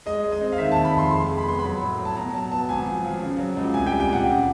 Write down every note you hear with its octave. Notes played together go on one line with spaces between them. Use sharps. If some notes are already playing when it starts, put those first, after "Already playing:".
G#3 D#5
G#3
D#5
C4
F5
D#3 E5
D#2 A5
B5
F1
C6
G#3 C6
G#3
B5
B3 C6
B5
F#3
A2
F#3
A5
B2 A#5
F#3 A5
B3 A5
G#1 G#5
F3
F3
C#3
F#3
C#2
C2 G#5
G3 G5
G5
A#2 F#5
C#3